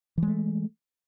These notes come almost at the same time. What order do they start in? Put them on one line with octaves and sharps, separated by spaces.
E3 G#3 A3